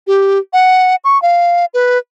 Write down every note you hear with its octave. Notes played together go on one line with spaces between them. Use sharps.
G4
F#5
C#6
F5
B4